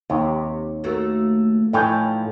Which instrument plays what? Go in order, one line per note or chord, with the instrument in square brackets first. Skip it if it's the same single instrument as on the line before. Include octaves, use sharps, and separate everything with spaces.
[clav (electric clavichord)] D#2 [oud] C3
[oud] A3 A#3 F#4
[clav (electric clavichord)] A2 G5 G#5 [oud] E3 F3 D#4